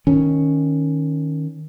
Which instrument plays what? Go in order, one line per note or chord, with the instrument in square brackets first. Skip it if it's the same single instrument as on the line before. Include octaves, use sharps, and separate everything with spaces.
[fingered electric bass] D#3 C#4